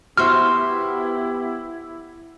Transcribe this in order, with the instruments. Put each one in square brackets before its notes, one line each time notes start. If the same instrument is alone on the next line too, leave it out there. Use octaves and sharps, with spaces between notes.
[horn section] B3 G4 [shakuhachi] E4 [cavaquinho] F#4 C5 E5 [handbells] F6